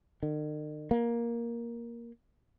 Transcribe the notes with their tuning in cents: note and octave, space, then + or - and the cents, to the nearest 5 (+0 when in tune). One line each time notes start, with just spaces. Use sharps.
D#3 -45
A#3 +10